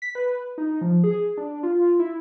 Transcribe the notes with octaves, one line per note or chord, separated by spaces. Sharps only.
B6
B4
D#4
F3
G#4
D4
F4
E4